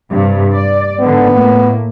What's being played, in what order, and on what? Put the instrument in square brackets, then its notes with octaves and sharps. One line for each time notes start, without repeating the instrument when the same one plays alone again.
[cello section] G2 C3
D5
[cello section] G#2 D3 [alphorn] B3
[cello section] A2 A#3